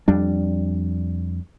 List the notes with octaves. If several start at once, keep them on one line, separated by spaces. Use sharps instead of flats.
F2 G3 D4